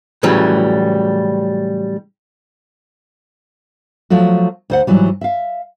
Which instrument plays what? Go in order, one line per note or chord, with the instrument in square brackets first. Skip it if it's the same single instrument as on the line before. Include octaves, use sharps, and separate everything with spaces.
[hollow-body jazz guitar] A2 C#3 E3 F#3 G3
[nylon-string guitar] F3 F#3 A3 F#4
D2 C5 F#5
G#2 E3 F#3 G3
E5 F5